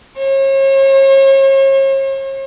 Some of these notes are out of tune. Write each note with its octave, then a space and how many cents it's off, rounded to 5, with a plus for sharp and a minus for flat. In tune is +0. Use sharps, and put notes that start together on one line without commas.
C#5 -40